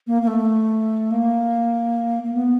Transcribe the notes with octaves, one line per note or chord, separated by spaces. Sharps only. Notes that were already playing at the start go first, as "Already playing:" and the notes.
A#3
A#3
A3
A#3
A#3
B3